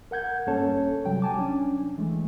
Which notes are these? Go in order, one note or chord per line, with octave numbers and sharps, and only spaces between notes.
A#4 F#5 G6 G#6
G2 A#3 C#4 A4 C#5 A5
C3 F#3 G3 G5
G#5 A5 D6
C#4 D4
E3 G#3 A3